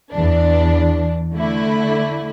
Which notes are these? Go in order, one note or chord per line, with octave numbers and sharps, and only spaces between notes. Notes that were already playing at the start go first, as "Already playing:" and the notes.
E2 E3 D4
D3 A3 E4